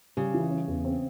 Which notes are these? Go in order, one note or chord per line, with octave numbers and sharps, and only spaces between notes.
C#3 G3
E3
C#4
E2
C4